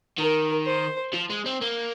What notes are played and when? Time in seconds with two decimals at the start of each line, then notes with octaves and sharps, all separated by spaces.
0.19 D#3 A#4
0.66 C5
1.13 F3
1.30 G#3
1.46 C4
1.61 A#3